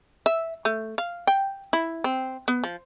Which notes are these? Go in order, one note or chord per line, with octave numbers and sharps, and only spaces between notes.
E5
A3
F5
G5
E4
C4
B3
F3